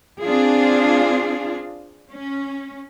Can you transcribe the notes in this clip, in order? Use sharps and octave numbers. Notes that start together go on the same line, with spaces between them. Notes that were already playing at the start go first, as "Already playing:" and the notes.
C4 D4 F4 G#4
C#4